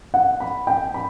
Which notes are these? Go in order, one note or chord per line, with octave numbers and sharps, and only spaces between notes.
F#5
B5
G5
B5